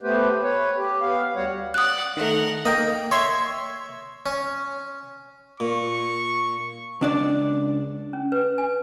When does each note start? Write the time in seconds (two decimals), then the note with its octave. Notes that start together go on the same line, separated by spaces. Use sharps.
0.01 A3 B3 G4 B4 C5
0.43 B4 C#5
0.77 G4
1.01 B3 F5
1.36 D2 G3 F#4 C#5 F#5
1.74 D5 F#5 D#6 F#6
2.17 D#3 A3 A#4 F#5
2.65 A#3 D#5 G5
3.11 C#5 E5 C6 G#6
4.26 C#4
5.60 A#2 C#6
7.01 C#2 D4 D5
8.13 C#4
8.32 B4
8.58 G#5